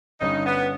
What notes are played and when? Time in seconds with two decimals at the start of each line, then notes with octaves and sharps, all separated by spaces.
0.21 G1 G2 G3 C#4 D#4
0.45 B3